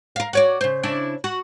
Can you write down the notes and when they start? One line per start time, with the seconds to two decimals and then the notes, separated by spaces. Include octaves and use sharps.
0.16 A#4 F5
0.33 F#4 C#5 D5
0.61 C#3 C5
0.83 C#3 D4 E4
1.24 F#4